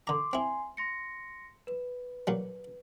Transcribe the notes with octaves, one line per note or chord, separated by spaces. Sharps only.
D3 A#5 C6 D6
C4 E4 G#5 C6
C6 A#6 C#7
B4
A#2 F#3 G3